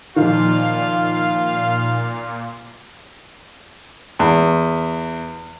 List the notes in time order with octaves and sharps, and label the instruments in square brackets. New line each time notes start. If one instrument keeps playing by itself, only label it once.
[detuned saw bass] A#2 [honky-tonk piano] D#3 F3 [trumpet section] F4 F5
[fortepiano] E2